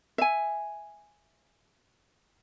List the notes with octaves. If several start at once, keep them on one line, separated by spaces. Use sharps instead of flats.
E5 G#5